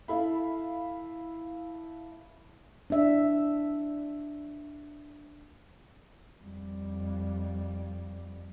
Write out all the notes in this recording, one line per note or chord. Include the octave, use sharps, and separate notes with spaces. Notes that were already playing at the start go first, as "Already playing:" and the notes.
E4 A4 F5 B5
D4 E5
F2 G3